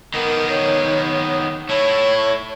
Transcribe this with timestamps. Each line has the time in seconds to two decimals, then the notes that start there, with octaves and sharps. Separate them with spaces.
0.14 D#3 B3 A#4
0.49 C#5
1.69 A3 E4 C#5